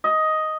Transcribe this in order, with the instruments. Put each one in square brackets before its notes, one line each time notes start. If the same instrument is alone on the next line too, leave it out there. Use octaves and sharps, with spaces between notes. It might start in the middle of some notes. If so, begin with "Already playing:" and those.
[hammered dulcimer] D#5